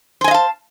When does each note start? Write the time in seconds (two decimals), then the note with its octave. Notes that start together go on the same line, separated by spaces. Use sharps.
0.21 C5
0.24 G#5
0.28 D#5
0.31 F5
0.34 A5